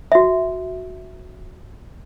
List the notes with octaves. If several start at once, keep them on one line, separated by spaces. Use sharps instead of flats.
F#4 E5